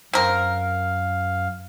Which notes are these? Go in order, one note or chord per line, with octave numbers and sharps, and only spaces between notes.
F#2 C4 A#4 F5